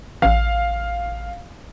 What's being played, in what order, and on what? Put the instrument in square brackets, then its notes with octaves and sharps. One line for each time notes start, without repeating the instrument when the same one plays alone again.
[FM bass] A1 [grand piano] F5